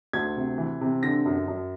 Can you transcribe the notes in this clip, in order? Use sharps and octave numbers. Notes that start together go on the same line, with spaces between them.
D2 G#6
C3
E3
C3
D3 A#6
F#2
F#2